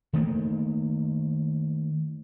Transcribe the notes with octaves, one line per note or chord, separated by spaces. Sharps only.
D#3 A3 A#3